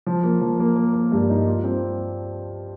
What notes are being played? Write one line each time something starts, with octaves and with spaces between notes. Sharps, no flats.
F3
A#3
F3
A#3
A#3
A#3
G2
D#4
F4
C4